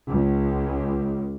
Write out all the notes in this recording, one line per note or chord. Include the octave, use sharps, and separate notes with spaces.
C#2